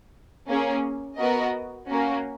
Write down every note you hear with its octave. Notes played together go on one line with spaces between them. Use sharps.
A#3 C#4 G#4
B3 F#4 A#4 D#5
A#3 C#4 F#4